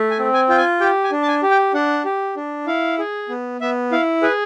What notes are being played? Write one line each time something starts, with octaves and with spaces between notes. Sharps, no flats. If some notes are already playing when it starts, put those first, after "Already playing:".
Already playing: A3
G#5
C4
G#5
F4 G5
G#5
G4 G5
G#5
D4
A5
G#5
G4
G5
D4 F#5
G4
D4
E4 F5
G#4
B3
B3 E5
E4 F5
G#4 B4